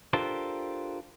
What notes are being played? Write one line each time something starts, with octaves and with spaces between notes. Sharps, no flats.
D4 F4 G4 A4 A#4 C5